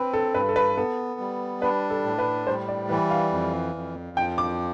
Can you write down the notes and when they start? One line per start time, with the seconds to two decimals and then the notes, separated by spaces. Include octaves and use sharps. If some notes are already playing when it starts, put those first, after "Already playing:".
Already playing: C4 B4
0.13 A4
0.34 G2 B4
0.49 A4
0.56 B4
0.76 B3 A4
1.20 G3
1.62 D4 B4
1.90 A4
2.04 A2
2.19 B4
2.47 G3 C5
2.68 D5
2.89 E3 B4
3.11 F5
3.32 F2
3.75 F2
4.17 F3 G5
4.38 D6